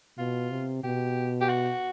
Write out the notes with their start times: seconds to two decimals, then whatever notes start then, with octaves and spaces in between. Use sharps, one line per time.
0.18 B2 F4
0.51 C3
0.84 B2 G4
1.41 G4
1.49 F#4